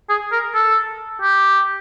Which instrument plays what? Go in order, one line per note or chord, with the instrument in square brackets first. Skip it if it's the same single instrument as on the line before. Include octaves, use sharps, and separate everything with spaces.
[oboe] G#4
A#4
A4
G4